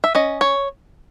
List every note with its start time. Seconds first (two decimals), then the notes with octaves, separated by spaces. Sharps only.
0.04 E5
0.15 C#4 D#5
0.41 C#5